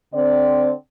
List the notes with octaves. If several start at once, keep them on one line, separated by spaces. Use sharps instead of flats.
D3 C4 D5